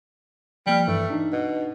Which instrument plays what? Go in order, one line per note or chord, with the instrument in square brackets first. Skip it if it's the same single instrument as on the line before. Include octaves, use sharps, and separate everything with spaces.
[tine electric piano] F3 A#3 F6 [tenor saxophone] G3
[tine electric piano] G2 E3 [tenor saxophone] A3
[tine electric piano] D4 D#4
[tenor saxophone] B2